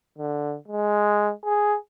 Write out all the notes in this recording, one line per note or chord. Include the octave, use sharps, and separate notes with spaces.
D3
G#3
G#4